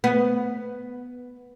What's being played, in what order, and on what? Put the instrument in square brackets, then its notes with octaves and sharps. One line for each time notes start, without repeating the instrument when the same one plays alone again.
[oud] B3